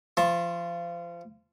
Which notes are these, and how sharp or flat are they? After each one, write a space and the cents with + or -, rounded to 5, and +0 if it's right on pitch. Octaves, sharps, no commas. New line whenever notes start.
F3 -25 A5 +0 C6 +45